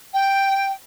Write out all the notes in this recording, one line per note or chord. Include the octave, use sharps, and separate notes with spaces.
G5